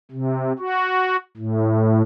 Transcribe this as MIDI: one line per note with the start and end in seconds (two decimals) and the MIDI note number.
0.11 0.53 48
0.59 1.17 66
1.37 2.02 45